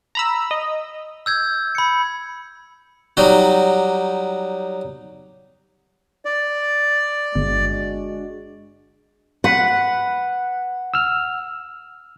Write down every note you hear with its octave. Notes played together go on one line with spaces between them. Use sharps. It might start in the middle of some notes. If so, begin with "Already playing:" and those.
A#5 B5 E6
D#5
E6 G6 G#6
B5 C#7
F#3 G3 D#4 F#4
D5
G1 G#3 D4 F#4
B4 F#5
E6 F6